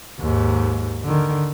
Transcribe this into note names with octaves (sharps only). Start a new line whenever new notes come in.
D#2 G#2
D3 D#3